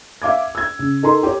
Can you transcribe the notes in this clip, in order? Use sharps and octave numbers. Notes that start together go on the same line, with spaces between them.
E5 F5 D6 G#6
E6 G#6
C#3
D#4 A4 A#4 A#5 C6
G4 C#5